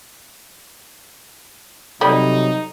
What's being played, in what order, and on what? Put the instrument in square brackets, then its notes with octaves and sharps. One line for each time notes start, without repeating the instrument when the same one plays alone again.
[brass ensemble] C3 F#3 [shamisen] G3 [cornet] D#4 [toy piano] A4 D5